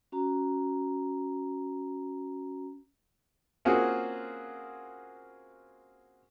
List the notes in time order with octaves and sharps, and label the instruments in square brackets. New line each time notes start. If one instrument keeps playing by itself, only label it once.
[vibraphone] C#4 F#4 A#5
[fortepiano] A#3 C4 C#4 F4 F#4 G#4